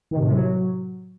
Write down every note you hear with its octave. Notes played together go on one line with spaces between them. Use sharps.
D#3
C3
A2
C3
F#3